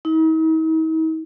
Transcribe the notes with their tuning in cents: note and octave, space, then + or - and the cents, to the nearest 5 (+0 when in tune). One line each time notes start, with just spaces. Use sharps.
D#4 +45